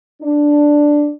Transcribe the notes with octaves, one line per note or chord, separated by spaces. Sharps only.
D4